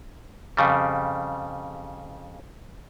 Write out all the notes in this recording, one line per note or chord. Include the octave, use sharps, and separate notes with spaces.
F2 C#3 G3